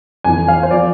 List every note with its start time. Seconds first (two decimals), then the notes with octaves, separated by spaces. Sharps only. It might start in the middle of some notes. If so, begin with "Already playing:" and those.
0.24 F2 E3 G#5
0.48 F5
0.63 C5
0.71 F3 D5